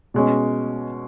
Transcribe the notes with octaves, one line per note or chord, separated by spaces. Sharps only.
B2 G#3 C#4